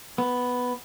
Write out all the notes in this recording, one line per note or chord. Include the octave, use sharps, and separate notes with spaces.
B3